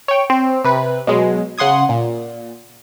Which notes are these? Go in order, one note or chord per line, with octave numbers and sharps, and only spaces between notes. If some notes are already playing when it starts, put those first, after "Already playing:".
C#5 G5
C4
C3 B4
B2 F#3 G#3
C#3 F#5 C6 D#6 G#6
A#2